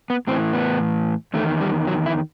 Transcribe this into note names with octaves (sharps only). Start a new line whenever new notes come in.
B3
A2 E3 C4
B3
E2 D#3 A3
G3
F#3
E4